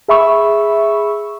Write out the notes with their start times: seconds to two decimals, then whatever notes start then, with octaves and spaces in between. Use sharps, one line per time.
0.08 G#4 E5 B5 C#6 E6